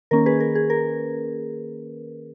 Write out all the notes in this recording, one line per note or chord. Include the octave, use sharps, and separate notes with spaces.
D#3 A#3 C#4 A#4
G#4 B4
A#4
G#4
A#4